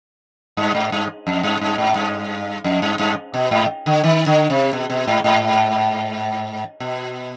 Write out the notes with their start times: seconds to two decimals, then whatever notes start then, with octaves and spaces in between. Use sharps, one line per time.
0.57 G2
0.75 G#2
0.92 G2
1.27 F2
1.43 G2
1.61 G2
1.78 G#2
1.95 G2
2.64 F2
2.82 G2
2.99 G2
3.34 B2
3.51 G#2
3.86 D3
4.04 D#3
4.26 D3
4.50 C3
4.73 B2
4.90 B2
5.07 G#2
5.24 G#2
6.80 B2